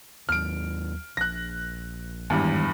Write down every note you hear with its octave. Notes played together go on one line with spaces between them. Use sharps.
D#2 F#3 F6 D7
A#1 F#6 A#6
E2 G2 D#3 G#3